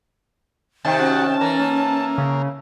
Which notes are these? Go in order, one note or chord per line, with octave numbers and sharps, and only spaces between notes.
C3 D#3 A5
C#4 F#4
E3 A#4
A#3
C#3